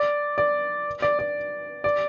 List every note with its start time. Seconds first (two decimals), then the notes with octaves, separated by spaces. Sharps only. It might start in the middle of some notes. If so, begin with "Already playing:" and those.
Already playing: D5
0.38 D5
1.02 D5
1.19 D5
1.84 D5